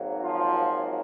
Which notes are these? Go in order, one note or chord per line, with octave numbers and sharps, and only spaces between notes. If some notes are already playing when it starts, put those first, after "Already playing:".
Already playing: G#1 G#2 F#3 A#3
F3 F4